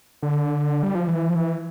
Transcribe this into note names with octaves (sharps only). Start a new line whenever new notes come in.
D3
G3
F3
E3
F3
E3